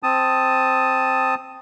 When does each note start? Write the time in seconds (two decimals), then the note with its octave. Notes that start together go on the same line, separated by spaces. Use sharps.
0.03 C4 A5 D#6